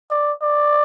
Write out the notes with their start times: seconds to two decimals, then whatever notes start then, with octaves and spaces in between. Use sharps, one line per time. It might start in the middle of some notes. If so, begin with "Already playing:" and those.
0.11 D5
0.42 D5